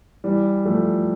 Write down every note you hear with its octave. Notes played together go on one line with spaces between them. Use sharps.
E3 G3
F3 A3